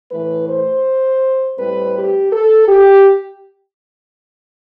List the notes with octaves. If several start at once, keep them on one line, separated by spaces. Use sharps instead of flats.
A2 E3 A3 B4
C5
A2 G3 C4 B4
G4
A4
G4